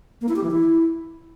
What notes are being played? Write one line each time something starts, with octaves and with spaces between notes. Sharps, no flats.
A#3
E4
G4
E3
E4